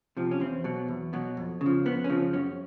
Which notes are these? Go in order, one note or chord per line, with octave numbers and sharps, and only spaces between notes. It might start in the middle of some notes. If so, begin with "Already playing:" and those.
C3 F3
C#4
E2 C4
B2 F#3
E2
B2 F#3
F2
C#3
F3
F2 B3
C#4
C#3 F3 C4
F#2 C#4